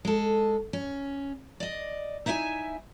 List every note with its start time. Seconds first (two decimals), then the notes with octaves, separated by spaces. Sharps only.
0.05 G#3 A4
0.73 C#4
1.60 D5 D#5
2.26 D#4 E4 E5 G5 G#5